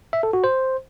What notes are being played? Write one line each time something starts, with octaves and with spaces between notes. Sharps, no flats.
E5
A4
F#4
C5